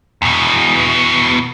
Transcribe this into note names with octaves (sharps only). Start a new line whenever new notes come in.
E2 B2